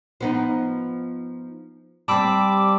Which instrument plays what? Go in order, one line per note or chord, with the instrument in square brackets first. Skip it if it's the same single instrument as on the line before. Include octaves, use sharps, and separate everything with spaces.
[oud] F3 B3 D#4
[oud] G3 C4 [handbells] A5 B5 E6 [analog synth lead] D6